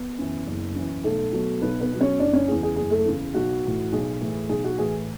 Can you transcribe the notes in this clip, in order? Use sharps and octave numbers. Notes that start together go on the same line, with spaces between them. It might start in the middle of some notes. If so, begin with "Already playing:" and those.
Already playing: B3
F#2 E3
F#1
F#2 E3
B1 A3 A4
B2 F#3
B1 B3 B4
B3 B4
B2 F#3
C#4 C#5
F#1 D4 D5
C#4 C#5
E2 C#3 G#4
G#4
F#1 G#4
A3 A4
E2 C#3
B1 F#4
A2 E3
B1 G#4
A2 E3
B1 G#4
F#4
A2 E3 G#4